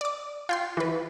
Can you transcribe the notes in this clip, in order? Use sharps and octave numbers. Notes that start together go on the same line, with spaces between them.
D5 D6
F4 G5 C6
E3 B4